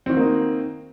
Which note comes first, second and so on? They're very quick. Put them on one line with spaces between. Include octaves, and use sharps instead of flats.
C4 D#3 F#4 A#3 D#4